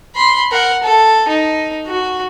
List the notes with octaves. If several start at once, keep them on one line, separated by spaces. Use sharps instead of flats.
B5 C6
A#4 F#5
A4
D#4
F#4